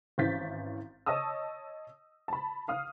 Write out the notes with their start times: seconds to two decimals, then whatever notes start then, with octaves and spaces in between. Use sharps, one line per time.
0.18 G#1 E3 C#4 G6 A6 B6
1.06 C#5 D#5 A5 D#6 E6
2.28 A5 B5
2.68 F5 D#6 F6